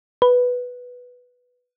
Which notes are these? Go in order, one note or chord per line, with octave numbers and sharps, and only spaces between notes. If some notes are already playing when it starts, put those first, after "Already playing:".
B4